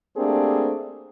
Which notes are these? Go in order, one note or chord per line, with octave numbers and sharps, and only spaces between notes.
A3 A#3 C4 D4 G4 G#4